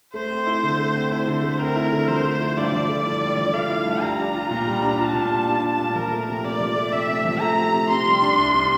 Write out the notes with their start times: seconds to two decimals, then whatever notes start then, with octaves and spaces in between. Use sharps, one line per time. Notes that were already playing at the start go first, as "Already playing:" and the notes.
0.14 A3 C5
0.30 C4
0.47 E4
0.63 D3
0.79 A3
0.95 C4
1.11 E4 C5
1.27 D3
1.43 A3
1.60 C4 A#4
1.76 E4
1.92 D3
2.08 F3 C5
2.24 A3
2.40 E4
2.57 G2 D5
2.72 F3
2.89 A3
3.05 E4
3.21 G2
3.37 F3
3.53 A3 F5
3.70 E4
3.85 G2
4.01 G3 A#5
4.18 D4
4.34 F4
4.51 A#2
4.67 G3
4.82 D4
4.99 F4 A5
5.15 A#2
5.31 G3
5.47 D4
5.63 F4
5.79 A#2
5.95 F3 A#4
6.12 A3
6.28 C3
6.44 C3 D5
6.60 F3
6.76 A3
6.92 C3 E5
7.08 C3
7.25 F3
7.40 A3 A#5
7.57 C3
7.73 C3
7.89 C3 C6
8.06 G3
8.21 D4
8.38 C2
8.54 C3